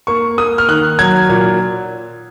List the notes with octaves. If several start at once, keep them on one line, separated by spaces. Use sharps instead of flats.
A#3 C#6
A#3 D#6
F6
D#3 F#6
F#3 G#6
A#2